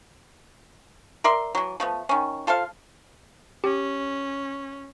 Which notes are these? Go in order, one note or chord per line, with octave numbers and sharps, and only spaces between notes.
A#4 D5 E5 C6
E3 F#3
F3 A3 B3
D#3 C#4
F4 A4 C5 F5
C#4 G4